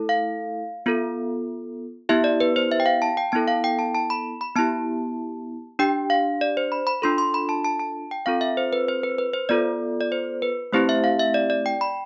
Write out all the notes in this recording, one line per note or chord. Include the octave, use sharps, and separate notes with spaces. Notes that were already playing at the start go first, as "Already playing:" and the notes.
Already playing: A3 E4 A4
F5
B3 F4 A4
B3 E4 G4 E5
D5
B4
C5
E5
G5
F5
A5
G5
B3 E4 A4 A5
F5
G5
A5
A5
B5
B5
B3 E4 G4 A5
D4 G4 G5
F5
D5
C5
B5
B5
D4 F4 A4 C6
C6
B5
A5
A5
A5
G5
C4 F4 A4 F5
E5
C5
B4
C5
B4
B4
C5
B3 F4 A4 D5
D5
C5
B4
A3 C4 E4 G4 C5
E5
F5
E5
D5
D5
G5
B5